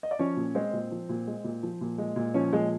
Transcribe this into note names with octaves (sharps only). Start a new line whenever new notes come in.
D#5
D5
F3 C#4 C#5
A#2
G#3 C4 C5
A#2
F3
A#2
G#3
A#2
F3
A#2
G#3
A#2
F3 C#4 C#5
A#2 G#3 G#4